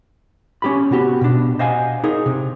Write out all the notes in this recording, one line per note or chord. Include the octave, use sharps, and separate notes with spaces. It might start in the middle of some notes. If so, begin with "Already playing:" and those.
C#4 G4 B5
C3 B3 F#4 G4
B2 D4
C5 D#5 F5 F#5 G#5
D#4 G#4 A#4
C3